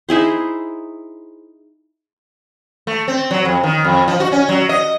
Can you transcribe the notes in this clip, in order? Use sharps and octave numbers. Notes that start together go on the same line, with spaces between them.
D#4 E4 G#4 C5
A3
C4
F#3
F2
D#3
F2
F3
F#4
C#4
F#3
D#5